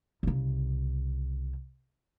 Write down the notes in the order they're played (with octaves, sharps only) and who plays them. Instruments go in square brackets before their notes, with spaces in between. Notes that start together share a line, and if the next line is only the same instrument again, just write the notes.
[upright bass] C2 C#3